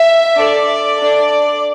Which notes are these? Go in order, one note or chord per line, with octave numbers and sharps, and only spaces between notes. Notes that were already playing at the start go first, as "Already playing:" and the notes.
Already playing: E5
D4 A4 D5
D4 A4